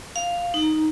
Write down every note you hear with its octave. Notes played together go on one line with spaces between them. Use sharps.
F5
D#4